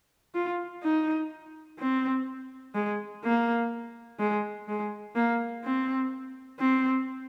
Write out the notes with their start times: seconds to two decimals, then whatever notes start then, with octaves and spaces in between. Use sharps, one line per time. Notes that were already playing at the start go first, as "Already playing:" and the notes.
0.35 F4
0.83 D#4
1.79 C4
2.75 G#3
3.24 A#3
4.19 G#3
4.68 G#3
5.15 A#3
5.64 C4
6.59 C4